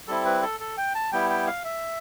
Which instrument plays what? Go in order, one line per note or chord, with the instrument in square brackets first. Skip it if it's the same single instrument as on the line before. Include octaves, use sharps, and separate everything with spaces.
[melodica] G3 C4 E4 A4
B4
A4
A4
G5
A5
G3 B3 E4 G5
G5
F5
E5